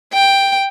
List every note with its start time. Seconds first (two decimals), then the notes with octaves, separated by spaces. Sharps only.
0.13 G5